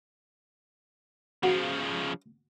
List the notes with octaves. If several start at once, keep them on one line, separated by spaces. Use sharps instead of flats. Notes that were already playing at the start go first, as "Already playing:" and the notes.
C#3 F3 F#4